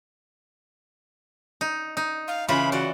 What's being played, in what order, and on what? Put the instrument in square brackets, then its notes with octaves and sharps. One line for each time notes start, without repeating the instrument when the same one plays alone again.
[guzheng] D#4
D#4
[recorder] F5
[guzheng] C#3 E3 F4 [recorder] B5
[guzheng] E3 D5 [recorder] F#4